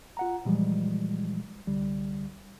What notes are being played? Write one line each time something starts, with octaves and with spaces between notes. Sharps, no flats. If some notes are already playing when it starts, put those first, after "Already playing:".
F4 F#5 A#5
A#2 E3 F3 G3 G#3
C2 D3 G3